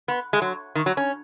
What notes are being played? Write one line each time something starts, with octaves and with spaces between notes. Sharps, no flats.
B3
G#3
F#3
D#3
F#3
C#4